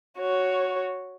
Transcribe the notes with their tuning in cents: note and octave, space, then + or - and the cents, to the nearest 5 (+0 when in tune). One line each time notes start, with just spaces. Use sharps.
F#4 +0 C#5 +0